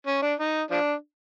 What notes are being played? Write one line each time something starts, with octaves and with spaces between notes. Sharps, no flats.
C#4
D4
D#4
F3 D4